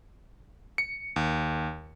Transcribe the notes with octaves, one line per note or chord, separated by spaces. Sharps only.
C#7
D#2